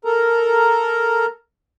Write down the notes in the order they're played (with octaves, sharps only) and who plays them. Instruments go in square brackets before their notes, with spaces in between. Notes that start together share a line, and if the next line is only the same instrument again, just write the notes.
[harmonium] A4 A#4 A#5